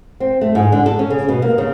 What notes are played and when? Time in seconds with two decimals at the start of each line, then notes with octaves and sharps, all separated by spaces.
0.20 C4
0.41 A3
0.55 G#2
0.72 D3
0.86 A4
0.99 C#4
1.10 C#3
1.29 B2
1.42 A#3
1.58 C#3